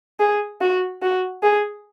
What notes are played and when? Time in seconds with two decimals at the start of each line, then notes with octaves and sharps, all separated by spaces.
0.20 G#4
0.61 F#4
1.02 F#4
1.43 G#4